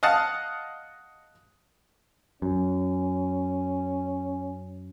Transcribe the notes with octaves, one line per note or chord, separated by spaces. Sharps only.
D#5 F5 F#5 A5
F#2 C#4